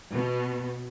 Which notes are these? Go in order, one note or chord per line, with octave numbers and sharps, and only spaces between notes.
B2